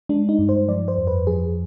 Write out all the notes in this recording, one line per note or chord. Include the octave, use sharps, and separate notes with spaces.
G#3 D4
D#4
G2
C5
F3 D5
C5
F2
B4
F3 G#4